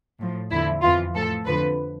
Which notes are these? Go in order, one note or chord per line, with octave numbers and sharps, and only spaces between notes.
A2 F3
E2 D3 F3 E4
F2 E3 F4
A2 F3 A4
F2 D3 F3 B4